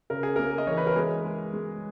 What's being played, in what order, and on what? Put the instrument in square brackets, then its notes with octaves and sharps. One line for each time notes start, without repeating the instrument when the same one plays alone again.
[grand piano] C#3 A#4
G#4
A#3 A#4
D#5
E3 C#5
B4
A#4
G#3 G#4
G#3
G#3